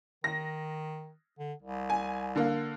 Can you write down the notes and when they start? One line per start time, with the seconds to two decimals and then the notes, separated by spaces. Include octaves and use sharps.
0.24 D#3 A#6
1.39 D3
1.62 C2
1.90 G#5
2.36 D3 A#3